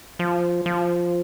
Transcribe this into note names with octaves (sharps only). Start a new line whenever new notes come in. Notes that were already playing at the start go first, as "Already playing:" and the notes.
F3
F3